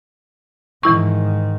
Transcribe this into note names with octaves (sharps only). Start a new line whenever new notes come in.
G#2 D#3 E3 E4 C#6